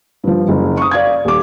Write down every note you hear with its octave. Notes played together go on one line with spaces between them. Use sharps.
G2 F3
F#1
C#6 D#6
D5 F5 G#6
D#1 D6